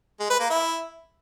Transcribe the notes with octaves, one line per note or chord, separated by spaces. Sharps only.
G#3
B4
A#3
E4